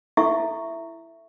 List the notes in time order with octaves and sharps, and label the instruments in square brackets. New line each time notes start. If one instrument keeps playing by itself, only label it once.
[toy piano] E4 A4 E5 C#6